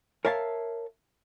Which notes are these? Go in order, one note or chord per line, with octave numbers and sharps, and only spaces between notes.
A#4 C#5 E5 F5 G#5 A5